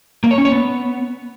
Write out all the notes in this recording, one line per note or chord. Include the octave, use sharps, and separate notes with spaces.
A#3
C#5
C#4
C#5
B3